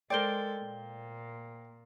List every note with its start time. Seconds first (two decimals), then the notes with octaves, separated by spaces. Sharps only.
0.10 G#3 A4 A#4 C5 D5 G5 G7
0.61 A#2